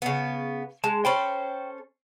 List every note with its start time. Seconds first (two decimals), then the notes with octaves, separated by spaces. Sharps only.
0.02 C#3 B3
0.84 G#3 A5
1.05 C#4 A4 C5 G5 B5